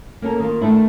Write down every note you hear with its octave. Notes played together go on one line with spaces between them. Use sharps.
A#3 C#4 A4 A#4
D#3 A#3 F4
D#3 A3 D4 E4